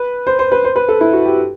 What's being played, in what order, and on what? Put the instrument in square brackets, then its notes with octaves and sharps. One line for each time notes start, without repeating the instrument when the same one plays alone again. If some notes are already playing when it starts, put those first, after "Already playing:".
Already playing: [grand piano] B4
C5
C5
B4
C5
B4
A4
E4
F#4
G4